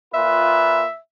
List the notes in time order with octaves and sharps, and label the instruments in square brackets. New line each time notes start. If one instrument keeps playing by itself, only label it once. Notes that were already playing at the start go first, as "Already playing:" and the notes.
[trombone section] A#2 F4 B4 [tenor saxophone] E5